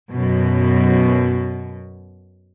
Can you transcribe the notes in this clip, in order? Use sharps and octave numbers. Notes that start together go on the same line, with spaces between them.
F#2 B2